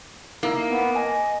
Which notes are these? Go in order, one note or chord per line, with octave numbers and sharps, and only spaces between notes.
A#3 D#4 E4
B3
D#5 G#5